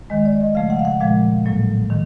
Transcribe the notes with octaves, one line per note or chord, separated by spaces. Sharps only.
D#3 G#3 D#5
D5
D#5
C#3 F3 A3 F5
F#5
F5
F#5
A#2 F3 G#3 F5
A2 F#3 A#3
D#3